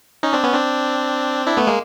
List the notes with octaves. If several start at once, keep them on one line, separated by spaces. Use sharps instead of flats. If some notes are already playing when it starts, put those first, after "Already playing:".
C#4 D#4
C4 D4
B3 C#4
C4 D4
D4 E4
A3 B3
G#3 A#3